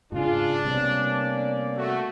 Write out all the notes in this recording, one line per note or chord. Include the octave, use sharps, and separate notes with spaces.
G#2 C#3 D4 F4 G#4
C3 G3 A#3 B3 C#4 D5
A3 F#4